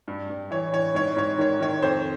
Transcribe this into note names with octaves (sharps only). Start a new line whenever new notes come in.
G2
G2
E3 C#5
E3 C#5
G#2 C#5
G#2 C#5
D#3 C#5
D#3 C#5
F2 C5